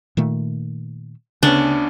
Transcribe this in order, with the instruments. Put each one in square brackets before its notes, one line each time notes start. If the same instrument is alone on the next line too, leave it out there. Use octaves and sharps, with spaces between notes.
[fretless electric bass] A#2 D#3 A3
[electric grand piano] D2 B3 C#4 [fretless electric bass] C#3 [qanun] D4